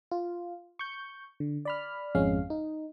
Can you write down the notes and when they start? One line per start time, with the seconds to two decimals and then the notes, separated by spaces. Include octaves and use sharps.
0.11 F4
0.79 C#6 G6
1.40 D3
1.65 D5 B5 F6
2.15 G#1 F2 G#3 C#4 F5
2.50 D#4